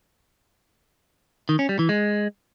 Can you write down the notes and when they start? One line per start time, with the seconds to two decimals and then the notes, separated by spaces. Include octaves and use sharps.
1.49 D#3
1.59 C#4
1.69 G3
1.79 E3
1.89 G#3